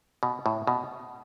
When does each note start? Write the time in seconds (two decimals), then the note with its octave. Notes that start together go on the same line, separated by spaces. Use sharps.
0.23 B2
0.46 A2
0.67 B2